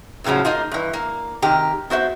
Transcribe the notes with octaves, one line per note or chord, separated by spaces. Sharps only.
F#2 A2 C#3 F3 F#3
A#3 D#4 F4
G2 E3
A#3
C3 D#3 G4 A#5
B3 F#4 C5 E5